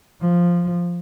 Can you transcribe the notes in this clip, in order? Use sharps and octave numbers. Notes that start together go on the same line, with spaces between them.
F3